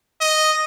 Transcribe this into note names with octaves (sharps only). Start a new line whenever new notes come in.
D#5